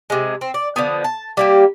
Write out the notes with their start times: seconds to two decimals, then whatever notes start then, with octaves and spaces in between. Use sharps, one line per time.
0.10 C3 G#3
0.41 C4
0.54 D5
0.76 D3 F3 B3
1.04 A5
1.37 G3 A#3 G4